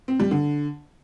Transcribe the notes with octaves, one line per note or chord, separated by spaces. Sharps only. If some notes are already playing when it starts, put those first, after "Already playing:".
C4
G3
D3